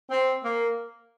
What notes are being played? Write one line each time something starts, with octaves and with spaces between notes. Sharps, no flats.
C4
A#3